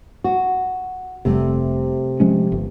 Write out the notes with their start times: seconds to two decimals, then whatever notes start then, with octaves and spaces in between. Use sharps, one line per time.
0.24 F#4
1.25 F1 C3 G3 A3
2.20 F3 G#3 C#4
2.52 G1